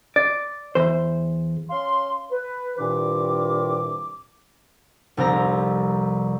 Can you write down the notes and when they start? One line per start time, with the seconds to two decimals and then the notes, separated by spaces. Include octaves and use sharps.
0.16 D5
0.75 E2 C5
1.70 C#4 F5 C6
2.31 B4
2.78 C2 G2 A#2 D#3 D6
5.17 F1 C2 C4 A#5